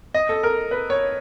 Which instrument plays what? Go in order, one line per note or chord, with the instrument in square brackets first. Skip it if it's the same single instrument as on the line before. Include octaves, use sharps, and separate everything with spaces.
[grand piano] D#5
A4
A#4
B4
C#5